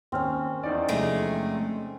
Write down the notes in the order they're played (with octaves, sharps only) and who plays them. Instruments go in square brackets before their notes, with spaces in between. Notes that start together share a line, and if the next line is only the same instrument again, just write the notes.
[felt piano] D#2 F6 [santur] C4 C#4
[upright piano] E2 D#4 D5
[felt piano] F2 C3 [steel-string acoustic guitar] G#3 A3